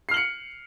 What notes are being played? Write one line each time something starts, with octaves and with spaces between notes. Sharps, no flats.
F6 C7 C#7 F#7